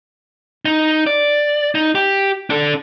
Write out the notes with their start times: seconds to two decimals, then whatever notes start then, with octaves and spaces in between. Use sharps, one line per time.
0.65 D#4
1.07 D5
1.75 D#4
1.95 G4
2.50 D4 A4